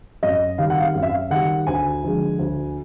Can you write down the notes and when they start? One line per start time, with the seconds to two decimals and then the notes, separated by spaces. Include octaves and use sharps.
0.23 F#2 D#5
0.58 D#3 G3 F5
0.70 F#5
0.80 F5
0.95 F#2 F5
1.03 E5
1.09 F5
1.30 D#3 G3 F#5
1.67 D2 G#5
2.03 D3 F3 G#3
2.39 D2